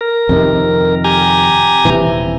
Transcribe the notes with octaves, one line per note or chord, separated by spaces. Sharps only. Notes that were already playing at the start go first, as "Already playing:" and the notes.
A#4
F2 C3 D#3
G4 G#5 A#5
D#1 C3 E3